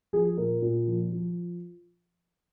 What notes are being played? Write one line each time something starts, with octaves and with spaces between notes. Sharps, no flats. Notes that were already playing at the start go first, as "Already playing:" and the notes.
F3 G#4
A#2 A#4
A#2
F3
F3